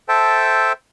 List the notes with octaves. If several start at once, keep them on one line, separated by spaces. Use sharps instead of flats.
A4 C5 E5 G5 A5